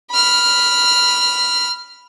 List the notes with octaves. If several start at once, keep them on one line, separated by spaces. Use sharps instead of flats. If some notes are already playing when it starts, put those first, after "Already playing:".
B5 F6